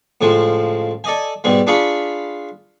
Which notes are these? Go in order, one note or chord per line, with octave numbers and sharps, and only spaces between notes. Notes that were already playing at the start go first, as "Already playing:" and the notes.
A2 C#3 F3 G#3
A4 D5 D#5 G#5
G#2 B2 G3 G#3
D4 F4 G#4 F5 B5 C#6